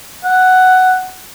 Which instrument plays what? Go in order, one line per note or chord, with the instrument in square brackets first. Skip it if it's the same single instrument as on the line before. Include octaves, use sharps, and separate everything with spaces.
[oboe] F#5